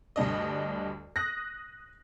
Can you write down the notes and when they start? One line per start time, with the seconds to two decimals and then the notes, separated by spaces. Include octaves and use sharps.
0.16 D2 G2 D4 D#5
1.16 D#6 F#6 A#6